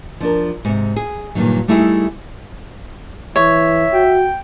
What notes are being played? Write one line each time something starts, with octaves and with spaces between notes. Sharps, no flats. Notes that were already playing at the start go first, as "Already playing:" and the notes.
F3 D4 A#4
G#2 C3
G#4
G2 A#2 D#3 F#3
G3 A3 D#4 E4 G4 G#4
E3 C#5 E5
F#4 G5